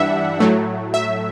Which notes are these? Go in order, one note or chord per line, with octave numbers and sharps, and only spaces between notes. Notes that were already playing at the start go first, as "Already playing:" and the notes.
Already playing: G2 E3 G3 D4 E5 F#5
A2 F#3 A3
E5